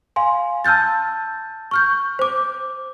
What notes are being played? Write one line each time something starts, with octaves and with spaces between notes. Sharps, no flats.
F5 G#5 C6
A5 E6 F6 G6 A6
C#6 F6 G6
C5 D6